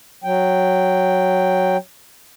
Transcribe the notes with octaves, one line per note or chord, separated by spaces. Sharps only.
F#3 G5